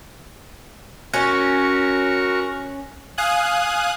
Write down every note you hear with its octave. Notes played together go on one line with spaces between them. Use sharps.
C#4 F#4 A#4 C#6
F5 G#5 D#6 F#6